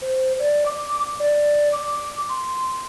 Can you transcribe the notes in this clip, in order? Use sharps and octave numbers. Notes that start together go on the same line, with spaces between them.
C5
D5
D6
D5
D6
C6